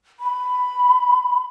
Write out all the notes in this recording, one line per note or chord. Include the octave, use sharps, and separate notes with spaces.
B5